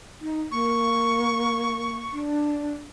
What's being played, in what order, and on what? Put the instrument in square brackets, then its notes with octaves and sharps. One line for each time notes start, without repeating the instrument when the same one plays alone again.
[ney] D#4
[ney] A#3 [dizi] C#6
[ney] D4